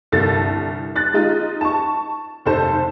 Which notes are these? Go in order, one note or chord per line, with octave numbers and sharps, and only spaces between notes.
G1 C2 A4 A6
F#6 A6
G#3 D#4 F4
A5 C#6
F1 B1 A4 C5 A5